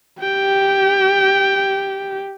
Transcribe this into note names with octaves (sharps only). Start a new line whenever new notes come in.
G4 G5